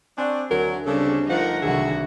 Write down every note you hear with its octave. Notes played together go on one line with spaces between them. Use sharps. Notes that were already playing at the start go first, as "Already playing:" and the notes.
C4 D4 G#5 C#6
D2 F#3 A#4
C#3 G3 C4 D4 A4
F3 A3 D#4 A#4 F#5
C2 D3 D#3 F#3 F#4 G#4 E5